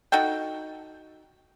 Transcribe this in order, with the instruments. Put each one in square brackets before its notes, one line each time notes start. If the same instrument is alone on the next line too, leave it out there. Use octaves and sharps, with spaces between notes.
[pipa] D#4 F#4 A4 G5